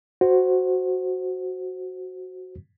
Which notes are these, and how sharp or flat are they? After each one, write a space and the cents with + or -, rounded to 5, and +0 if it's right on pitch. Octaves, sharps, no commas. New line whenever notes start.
F#4 +0 C5 +0